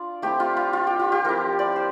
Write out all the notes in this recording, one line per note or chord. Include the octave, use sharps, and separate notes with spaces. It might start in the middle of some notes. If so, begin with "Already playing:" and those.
Already playing: D4 F4 D5
A3 C4 E4 G4
F4
F4
F4
G4
F4
G4
F3 C4 E4 A#4
D5
C5